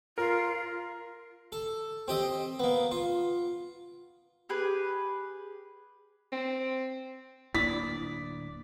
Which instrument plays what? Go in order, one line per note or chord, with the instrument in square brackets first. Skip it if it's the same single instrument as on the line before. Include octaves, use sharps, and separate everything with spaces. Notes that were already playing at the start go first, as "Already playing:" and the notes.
[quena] F4 [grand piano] A#4
[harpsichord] A4
C4 G4 D#5
A#3 B3
F4
[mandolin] G4 G#4 B4
[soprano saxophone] C4
[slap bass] D1 A#3 D4 [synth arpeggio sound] E4 D#6 [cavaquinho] D5 [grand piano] B6